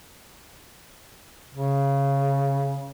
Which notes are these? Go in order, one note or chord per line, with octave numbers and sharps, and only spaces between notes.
C#3